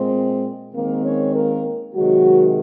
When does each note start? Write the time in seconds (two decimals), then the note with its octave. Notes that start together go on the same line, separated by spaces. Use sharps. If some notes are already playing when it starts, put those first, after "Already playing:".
Already playing: A#2 G#3 C4
0.74 D#3 G#3 A#3 C4 A#4
1.04 C#4 C#5
1.35 A#3 A#4
1.95 C3 D#3 F#3 G#3 F#4